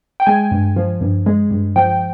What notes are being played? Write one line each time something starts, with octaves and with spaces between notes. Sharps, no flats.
G5
G#3 G#5
G2
F3
G2
G#3
G2
F3 G5